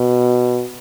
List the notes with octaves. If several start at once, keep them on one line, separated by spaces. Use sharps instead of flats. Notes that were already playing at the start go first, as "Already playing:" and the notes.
Already playing: B2